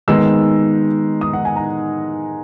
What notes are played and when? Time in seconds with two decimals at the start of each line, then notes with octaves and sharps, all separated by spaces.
0.08 D#3 G#3 B3 D#4 E6
1.21 D#6
1.33 F#5
1.45 G#5
1.56 A#5